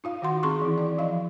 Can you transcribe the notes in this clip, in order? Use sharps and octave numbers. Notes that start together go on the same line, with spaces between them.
D#4 F4 F5
D#3 F#4 F#5 C6
C4 G#4 C6 C#6
E3 E4
D5
F3 D#5 F5